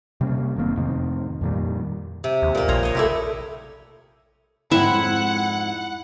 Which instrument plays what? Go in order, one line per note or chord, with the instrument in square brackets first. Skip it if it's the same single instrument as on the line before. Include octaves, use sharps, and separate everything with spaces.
[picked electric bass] C3 G3 A#3 C#4
F#1 D#3 A#3 C4
F2 A2 C3 D#3
F2 A#2 D#3 G3
[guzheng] C3
[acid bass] D#2
[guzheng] A#2 A#3
[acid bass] A#1 [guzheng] C5 C#5 A#5
[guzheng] C#5 D#5
[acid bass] C3 [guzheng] A3 E4 G4
[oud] F2 G#2 C4 [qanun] E4 E5 [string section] F#5